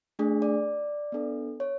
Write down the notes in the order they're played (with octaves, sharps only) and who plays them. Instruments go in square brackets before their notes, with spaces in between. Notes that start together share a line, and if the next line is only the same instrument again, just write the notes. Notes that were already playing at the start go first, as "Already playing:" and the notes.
[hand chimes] A3 D4 G#4
D5
B3 D4 A4
C#5